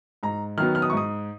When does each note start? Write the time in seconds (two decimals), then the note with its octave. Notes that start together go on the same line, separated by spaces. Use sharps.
0.23 G#2 A#5
0.57 D#3 F#3 B3 F6
0.75 F6
0.82 D#6
0.90 C#6
0.93 G#2 D#6